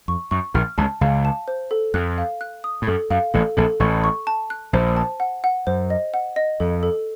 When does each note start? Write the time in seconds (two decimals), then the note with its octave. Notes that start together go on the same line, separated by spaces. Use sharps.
0.08 F2 C#6
0.31 F#2 C#6
0.54 A#1 A#2 F6
0.78 C#2 C#3 A5
1.01 C#2 C#3 F5
1.25 A5
1.48 C5
1.71 A4
1.94 F2 F#6
2.18 F5
2.41 F#6
2.64 D#6
2.82 A2
2.87 F#2 A4
3.10 F#2 F5
3.34 A1 A2 A4
3.57 A#1 A#2 A4
3.80 A1 A2 C#6
4.04 C#6
4.27 A5
4.50 F#6
4.73 A#1 A#2 C5
4.97 A5
5.20 F#5
5.44 F#5
5.67 F#2 C5
5.90 D#5
6.14 F#5
6.36 D#5
6.60 F2 A4
6.83 A4